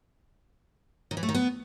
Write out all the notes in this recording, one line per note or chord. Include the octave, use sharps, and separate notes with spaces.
D#3
E3
A3
D#3
B3